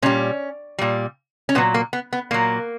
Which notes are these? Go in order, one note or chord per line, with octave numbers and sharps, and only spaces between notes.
A#2 G3 C#4
A#2 G3
C#4
A#2 F#3 B3
A#3
B3
B3
A#2 F#3 A#3